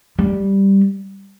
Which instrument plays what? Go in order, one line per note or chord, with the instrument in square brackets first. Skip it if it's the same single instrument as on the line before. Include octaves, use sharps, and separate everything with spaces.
[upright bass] G3